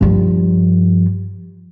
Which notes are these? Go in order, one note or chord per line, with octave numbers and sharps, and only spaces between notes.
G2 F3